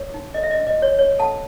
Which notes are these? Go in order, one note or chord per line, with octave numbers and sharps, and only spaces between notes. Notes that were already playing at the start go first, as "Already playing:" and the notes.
Already playing: C#5
D#4
A4 D#5
E5
D#5
C#4
D#5
F#4 C#5
C#5
A4 F#5 A5